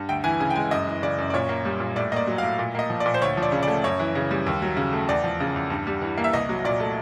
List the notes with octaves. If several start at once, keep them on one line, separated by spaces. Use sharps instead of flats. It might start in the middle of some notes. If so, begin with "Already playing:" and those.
Already playing: G2
D2 G5
E3 G#5
C#3 G#5
G5
G#3 G#5
F#2 D#5
E3
C#3 D5
F#2
D5
A#2 C#5
A#3
G3
A#2
A2 D5
A#3 D5 D#5
F#3
F5
A2
A#2
A#3 D#5
F3
D5
A#2
C5
D2 C#5
F3
D5
C#3
D5
A3
F#2 C#5
E3
C#3
G3
D#2
F#3
C#3
A3
E2 D5
F3
C#3
E2
G2
G3
E3
A#3
E5
C2 D#5
F#3
A#2 D5
A3